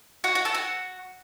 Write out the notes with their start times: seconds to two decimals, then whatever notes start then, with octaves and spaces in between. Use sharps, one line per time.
0.24 F#4 F#5
0.35 F#4 F#5
0.45 A4 A5
0.54 F#4 F#5